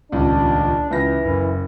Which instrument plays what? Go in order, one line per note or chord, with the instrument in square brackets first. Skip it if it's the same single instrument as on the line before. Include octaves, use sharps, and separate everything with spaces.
[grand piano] D#1 C#2 [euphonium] D4
[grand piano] C#2 A#6 [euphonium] E3
[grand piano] F#1